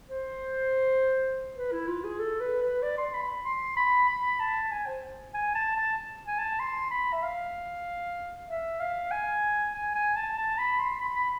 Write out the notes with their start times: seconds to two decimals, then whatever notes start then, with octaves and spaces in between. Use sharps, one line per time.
0.09 C5
1.57 B4
1.72 E4
1.88 F4
2.04 G#4
2.19 A4
2.41 B4
2.62 B4
2.82 D5
2.98 C6
3.14 B5
3.45 C6
3.77 B5
4.08 B5
4.40 A5
4.71 G#5
4.87 C5
5.34 G#5
5.55 A5
5.76 A5
6.27 G#5
6.39 A5
6.59 C6
6.91 B5
7.13 E5
7.23 F5
8.49 E5
8.80 F5
9.11 G#5
9.74 G#5
9.95 G#5
10.16 A5
10.38 A5
10.58 B5
10.79 C6
11.00 B5
11.16 B5